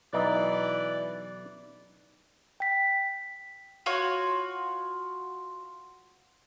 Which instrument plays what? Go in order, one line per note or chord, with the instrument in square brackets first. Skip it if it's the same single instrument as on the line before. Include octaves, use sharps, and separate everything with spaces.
[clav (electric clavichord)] B1 D#4 E5 [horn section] E3 B4 D5
[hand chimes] G5 B6
[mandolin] F4 F#4 C#5